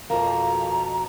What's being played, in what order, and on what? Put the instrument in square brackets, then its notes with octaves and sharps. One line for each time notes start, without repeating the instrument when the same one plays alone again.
[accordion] F2 B2 F3 [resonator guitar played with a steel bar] A#3 [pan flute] A#5